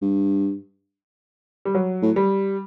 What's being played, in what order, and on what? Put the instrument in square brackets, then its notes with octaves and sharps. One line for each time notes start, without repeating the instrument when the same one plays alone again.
[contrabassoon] G2
[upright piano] G3
F#3
[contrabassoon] A2
[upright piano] G3